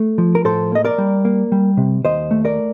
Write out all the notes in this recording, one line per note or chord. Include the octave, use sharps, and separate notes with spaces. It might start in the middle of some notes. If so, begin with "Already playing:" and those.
Already playing: A3
F3
A#4
A2 A4 C5
A#3 D#5
A#4 D5
G3
A#3
G3
C3
D#2 C5 D#5
A3
A#4 D5